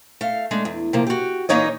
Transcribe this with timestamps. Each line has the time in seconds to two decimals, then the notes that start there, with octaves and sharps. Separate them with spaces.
0.21 A3 F5
0.51 G#3 A3 D4
0.65 E2
0.93 C3 F3 A#3
1.07 F#4 G4
1.49 A#2 E3 A#3 D#4 C#5 D#5